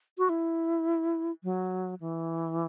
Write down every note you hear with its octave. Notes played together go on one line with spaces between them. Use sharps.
F#4
E4
F#3
E3